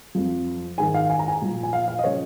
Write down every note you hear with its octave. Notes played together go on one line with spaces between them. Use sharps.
F2 F3
G#2 D#3 G#5
F5
G#5
A#5
G#5
A#2 F3
G#5
F5
F5
D#5
C#3 F3 C#5